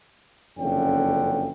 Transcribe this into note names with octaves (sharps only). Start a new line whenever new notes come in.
F#1 F2 D3 C#4 G5